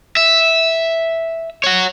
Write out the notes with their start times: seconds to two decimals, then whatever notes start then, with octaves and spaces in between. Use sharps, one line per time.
0.17 E5
1.64 C#5 F#5